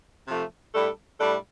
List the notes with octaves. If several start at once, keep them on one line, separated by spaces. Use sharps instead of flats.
C3 F3 A3
A2 G3 D4 A4
A2 G3 D4 A4